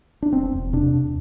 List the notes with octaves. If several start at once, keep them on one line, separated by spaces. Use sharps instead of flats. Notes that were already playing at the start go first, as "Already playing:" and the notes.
D4
E1 C4
E1
C3 D4
E2